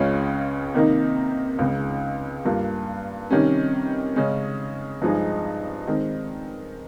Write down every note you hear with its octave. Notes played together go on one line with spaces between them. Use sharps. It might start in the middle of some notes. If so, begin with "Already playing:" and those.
Already playing: C#2 C#3 G#3 C#4 F4
C3 D#3 A#3 D#4
C#2 C#3 G#3
G2 G3 A#3 F4
C3 D#3 G3 C#4
C#3 G#3 C#4
G2 F3 G#3 D#4 G#4
D#3 G#3 C4